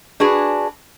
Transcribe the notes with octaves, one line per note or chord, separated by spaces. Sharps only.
D4 F#4 G#4 B4